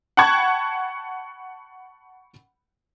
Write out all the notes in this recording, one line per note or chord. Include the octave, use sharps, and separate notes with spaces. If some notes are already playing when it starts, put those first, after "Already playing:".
F#5 G5 A5 B5 C#6 G#6